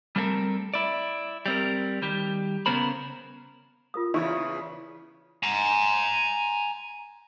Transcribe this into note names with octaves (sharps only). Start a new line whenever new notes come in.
G3 A3 C4 F4 A4 A#4
E4 D5
G3 C4 A#4
D#3 G3 G4
C#3 B3 C#4 A#4 C5 B5
F4 A#4 D#6
E2 C#3 E4 C6 C#6
G#5 A#5